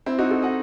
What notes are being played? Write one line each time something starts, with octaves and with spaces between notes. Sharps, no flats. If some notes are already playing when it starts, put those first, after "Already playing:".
C4 E4
D#4 F#4
F#4 A4
D#5 F#5